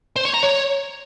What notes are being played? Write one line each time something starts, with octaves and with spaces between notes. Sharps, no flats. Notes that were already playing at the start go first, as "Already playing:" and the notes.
C5
C#5
A#5
C#5